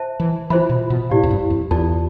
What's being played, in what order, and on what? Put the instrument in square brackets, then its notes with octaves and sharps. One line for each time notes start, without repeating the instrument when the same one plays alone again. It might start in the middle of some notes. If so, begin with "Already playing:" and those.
Already playing: [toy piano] C5 E5 A5
[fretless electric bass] E3
[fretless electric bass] E3 [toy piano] F4 C5 E5 B5
[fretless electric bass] B2
B2
[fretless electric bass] A2 [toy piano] E4 G4 D5 F5
[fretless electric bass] F2
G2
F2
[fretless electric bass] E2 [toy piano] F4 A4 D5 A5